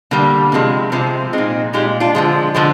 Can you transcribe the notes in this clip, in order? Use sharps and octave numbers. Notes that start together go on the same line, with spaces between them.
D3 G3 A#3
C3 F3 G#3
C3 F3 G#3 C4
A#2 G#3 C4 D#4
A#2 G#3 D#4 G4
D4 F4
D3 F3 G#3
D3 F3 G#3